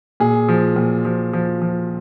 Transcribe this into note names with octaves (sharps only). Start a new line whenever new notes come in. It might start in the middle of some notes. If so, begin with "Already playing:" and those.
A#2 G#4
F3
A#2
F3
F3
F3